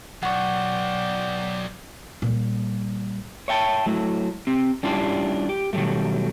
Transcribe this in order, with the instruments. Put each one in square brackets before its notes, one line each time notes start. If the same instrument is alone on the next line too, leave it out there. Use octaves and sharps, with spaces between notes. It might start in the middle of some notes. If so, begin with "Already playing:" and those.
[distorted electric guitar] B1 [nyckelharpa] D5 G5 [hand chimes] F#5 C#6
[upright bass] A#2 G3
[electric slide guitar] C#5 E5 G5 A5
F#3 A3 E4
C4 G4
G3 C#4 D4 E4 F4 G4
G4
B2 D#3 F#3 G3 A3